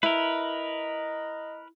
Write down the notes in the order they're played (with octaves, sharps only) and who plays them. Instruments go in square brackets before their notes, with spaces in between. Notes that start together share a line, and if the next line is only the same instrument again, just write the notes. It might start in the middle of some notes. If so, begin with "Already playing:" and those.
[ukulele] E4 [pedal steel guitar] A#4 B4 [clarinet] D#5